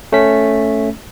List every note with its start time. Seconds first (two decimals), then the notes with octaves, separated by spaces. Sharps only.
0.12 A3 C#4 B6